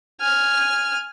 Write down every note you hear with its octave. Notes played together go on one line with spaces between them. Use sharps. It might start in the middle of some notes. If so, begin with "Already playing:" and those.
G#5 F6